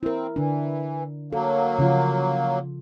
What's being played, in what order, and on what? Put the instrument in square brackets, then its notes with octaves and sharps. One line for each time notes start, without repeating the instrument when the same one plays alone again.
[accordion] C4 [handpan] E4 A#4
[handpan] D3 D4 [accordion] E3
[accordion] F#3 A#3 [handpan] A4
[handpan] C#3 F3 F4